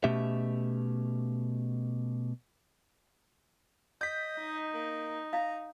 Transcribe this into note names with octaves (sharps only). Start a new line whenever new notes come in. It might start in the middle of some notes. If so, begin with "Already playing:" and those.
B2 A3 C#4 G4 E5
D#5 G6 B6
D#4
A#3
F5 A#5